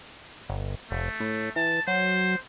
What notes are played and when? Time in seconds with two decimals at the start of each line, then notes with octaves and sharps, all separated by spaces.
0.50 G1
0.91 F1 A3
1.20 A2
1.56 E3 A5
1.88 F#3 C5